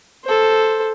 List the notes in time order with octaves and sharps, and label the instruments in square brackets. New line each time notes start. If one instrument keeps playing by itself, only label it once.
[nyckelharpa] A4 C5